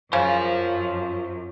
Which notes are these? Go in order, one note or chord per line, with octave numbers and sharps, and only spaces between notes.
F#2 C#3 F4 C5